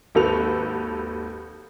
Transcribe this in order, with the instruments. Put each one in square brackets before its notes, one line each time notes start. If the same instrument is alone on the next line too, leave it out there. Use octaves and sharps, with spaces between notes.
[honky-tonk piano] G#1 D#2 F#4 A4 B4 F7